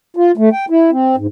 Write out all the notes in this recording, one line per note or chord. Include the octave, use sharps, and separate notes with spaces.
F4
A3
G5
E4
C4
G#2